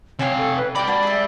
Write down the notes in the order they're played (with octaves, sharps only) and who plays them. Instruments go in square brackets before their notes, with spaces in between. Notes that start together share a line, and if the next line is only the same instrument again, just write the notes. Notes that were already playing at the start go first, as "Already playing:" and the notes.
[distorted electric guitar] C3 F5 [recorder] C#5 [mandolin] G5 G#5 E6
[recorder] A4
B4
[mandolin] D#4 D5 [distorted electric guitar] G4 B5 [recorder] G5
[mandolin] A#3 D4 F#4 [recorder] D5
[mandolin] G#4 E5